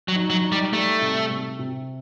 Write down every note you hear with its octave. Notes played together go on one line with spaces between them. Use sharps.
F#3
D#4
F#3
D#4
G3
G3 A3
C3
C3
C3